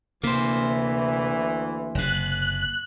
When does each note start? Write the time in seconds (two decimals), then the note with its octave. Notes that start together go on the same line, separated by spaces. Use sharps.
0.23 D2 C3 E3 A#3 C5
1.95 F#1 C3 F#6